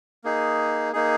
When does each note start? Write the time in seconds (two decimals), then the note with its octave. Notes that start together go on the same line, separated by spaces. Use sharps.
0.24 A#3 D#4 G#4
0.93 A#3 D#4 G#4